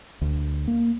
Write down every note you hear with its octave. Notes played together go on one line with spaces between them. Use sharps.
D2
A#3